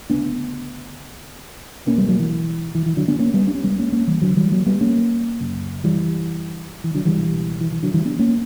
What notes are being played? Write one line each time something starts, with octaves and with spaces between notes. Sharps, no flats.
D2 C#3 B3 D4
C#2 B2 A#3 C#4
G3 B3
F#3 A#3
E3
E3
E3
D3 F#3
B3 D4
A#3 C#4
G3 B3
D4
C#4
C#2 C#3 G3 B3
A#3 C#4
A#3 C#4
E3 G3
D3 F#3
E3 G3
F#3 A#3
G3 B3
A#3 C#4
F#2 C#3
E3 G3
E3
D3 F#3
E3 G3
C#2 B2
E3
E3
D3 F#3
E3 G3
B3 D4
A#3 C#4